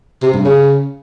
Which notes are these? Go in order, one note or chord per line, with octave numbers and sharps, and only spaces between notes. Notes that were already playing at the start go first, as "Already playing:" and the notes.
C3
G2
C#3